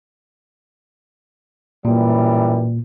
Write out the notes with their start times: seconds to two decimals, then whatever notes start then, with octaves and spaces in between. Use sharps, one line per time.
1.85 F#2 A#2 E3 G3